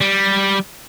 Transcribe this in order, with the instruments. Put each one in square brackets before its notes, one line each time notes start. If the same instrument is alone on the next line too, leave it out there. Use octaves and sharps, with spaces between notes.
[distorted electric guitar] G3